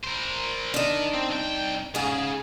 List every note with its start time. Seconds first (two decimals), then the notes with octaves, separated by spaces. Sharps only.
0.04 A#4 C5
0.74 D4 D#4 A#4 D#5
1.14 C4
1.30 C2 G5
1.95 G#2 C#3 G#4